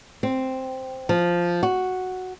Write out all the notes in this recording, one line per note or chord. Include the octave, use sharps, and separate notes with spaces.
C4
F3
F#4